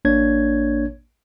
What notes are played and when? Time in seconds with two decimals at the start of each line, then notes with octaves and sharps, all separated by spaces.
0.05 A1 A#3 D4 C#5 G#6